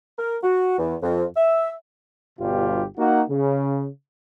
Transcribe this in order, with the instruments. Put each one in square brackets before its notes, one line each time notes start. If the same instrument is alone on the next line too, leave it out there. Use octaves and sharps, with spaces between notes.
[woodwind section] A#4
F#4
E2
F2
E5
[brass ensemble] G1 G2 B2 F4 G4
A#3 D#4 F#4
C#3